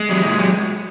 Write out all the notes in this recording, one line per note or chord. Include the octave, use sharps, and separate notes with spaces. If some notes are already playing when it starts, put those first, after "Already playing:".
Already playing: G#3
F#3
A#2
F#3